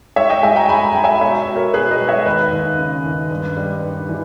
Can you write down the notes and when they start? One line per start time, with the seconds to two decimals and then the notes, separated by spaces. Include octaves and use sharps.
0.16 G#3 C#5 E5
0.30 D#5 G5
0.43 G#3 E5 G#5
0.56 G5 A#5
0.69 G#3 G#5 B5
0.95 G#3 G5
1.04 E5 G#5
1.21 B2 C#5 E5
1.48 B2
1.56 A#4 C#5
1.74 B2 G#4 B4
1.90 B4 D#5
2.00 G#3
2.08 C#5 E5
2.26 D#2 B4 D#5
2.52 D#2
2.78 C#3
3.05 D#2
3.31 G2
3.57 G3
3.83 G2
4.09 E3